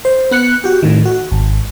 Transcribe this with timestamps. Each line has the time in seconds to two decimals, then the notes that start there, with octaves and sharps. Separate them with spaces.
0.05 C5
0.31 B3 F#6 C#7
0.64 F#4 G4
0.83 A2 D#3
1.05 F#4
1.31 G#1